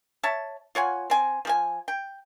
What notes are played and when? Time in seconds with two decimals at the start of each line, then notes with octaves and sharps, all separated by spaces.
0.23 C#5 E5 A5
0.75 F4 C#5 F#5 G#5
1.10 C4 G#5
1.45 F3 G#4 G#5
1.88 G5